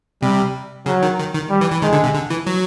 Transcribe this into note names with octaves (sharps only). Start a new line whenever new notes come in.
C3 G3
C#3 F#3
D#3
D#3
D#3
G3
E3
E3
D#3 G#3
D3
C3
D3
E3
F#3